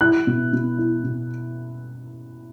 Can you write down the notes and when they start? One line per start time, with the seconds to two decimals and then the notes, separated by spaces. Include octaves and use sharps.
0.01 E4 F#6
0.27 B2
0.53 B2
0.78 E4
1.04 B2